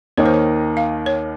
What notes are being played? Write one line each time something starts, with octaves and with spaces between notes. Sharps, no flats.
D#2 D#3 A#3 D#4 C#5
C5
C#5
F5
C#5